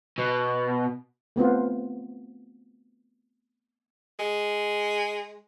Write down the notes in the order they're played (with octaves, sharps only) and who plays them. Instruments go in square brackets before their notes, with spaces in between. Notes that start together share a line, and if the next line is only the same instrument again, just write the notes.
[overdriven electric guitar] B2
[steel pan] A3 B3 C4 F4
[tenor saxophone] G#3